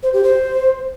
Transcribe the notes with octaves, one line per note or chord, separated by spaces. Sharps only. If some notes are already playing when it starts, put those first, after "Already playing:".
C5
G4
C5